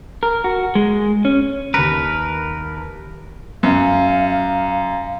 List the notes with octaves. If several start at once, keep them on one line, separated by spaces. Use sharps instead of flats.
A#4
F#4
G#3
C#4
D#2 A#4 B4 C#7
F#2 F5